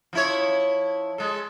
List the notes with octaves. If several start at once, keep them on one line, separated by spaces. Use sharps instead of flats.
F3 E4 C#5
G#3 A4